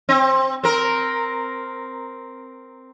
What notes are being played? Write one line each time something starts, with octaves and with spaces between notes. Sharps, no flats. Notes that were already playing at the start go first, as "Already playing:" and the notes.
C4
C4 A#4